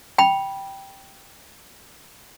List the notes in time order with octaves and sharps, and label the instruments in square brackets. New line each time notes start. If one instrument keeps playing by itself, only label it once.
[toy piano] G5 B5